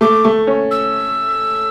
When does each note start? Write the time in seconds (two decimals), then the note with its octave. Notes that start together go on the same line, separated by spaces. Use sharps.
0.01 A3 D6
0.24 A3 C#6
0.47 C#4
0.71 E6